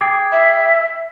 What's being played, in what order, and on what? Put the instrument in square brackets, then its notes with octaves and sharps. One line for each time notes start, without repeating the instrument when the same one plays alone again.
[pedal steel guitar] G#4 G5 D6
[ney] E5